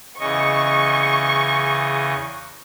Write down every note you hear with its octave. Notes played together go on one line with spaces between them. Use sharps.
E2 C#3 D#5 C#6